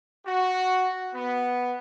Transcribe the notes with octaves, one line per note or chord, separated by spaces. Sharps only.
F#4
B3